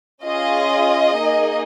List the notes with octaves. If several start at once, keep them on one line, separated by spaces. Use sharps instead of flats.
C#4 F4 G#4 D#5
A#3 D#4 G#4